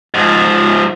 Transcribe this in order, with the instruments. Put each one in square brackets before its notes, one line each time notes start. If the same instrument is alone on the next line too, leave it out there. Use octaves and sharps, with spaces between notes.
[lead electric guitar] G#2 F3